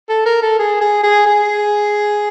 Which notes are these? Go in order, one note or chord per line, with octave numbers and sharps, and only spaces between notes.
A4
A#4
A4
G#4
G#4
G#4
G#4